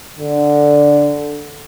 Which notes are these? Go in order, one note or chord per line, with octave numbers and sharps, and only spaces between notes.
D3